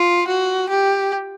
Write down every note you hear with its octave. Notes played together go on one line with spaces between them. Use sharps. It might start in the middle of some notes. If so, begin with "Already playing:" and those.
Already playing: F4
F#4
G4